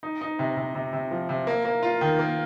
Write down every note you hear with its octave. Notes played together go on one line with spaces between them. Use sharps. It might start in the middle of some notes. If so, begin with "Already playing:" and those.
D#4
D#4
C3
C3
C3
C3
F3
C3
A#3
A#3
F4
D#3
A#3